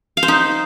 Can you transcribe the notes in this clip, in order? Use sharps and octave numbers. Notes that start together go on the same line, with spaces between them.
F5
C5
D#4